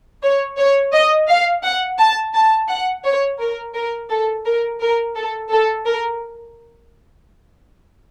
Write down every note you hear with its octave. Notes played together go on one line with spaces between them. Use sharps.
C#5
C#5
D#5
F5
F#5
A5
A5
F#5
C#5
A#4
A#4
A4
A#4
A#4
A4
A4
A#4